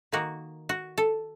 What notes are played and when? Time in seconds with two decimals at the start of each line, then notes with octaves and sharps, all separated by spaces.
0.12 D#3 A#3 D#4 F#4
0.69 F#4
0.98 A4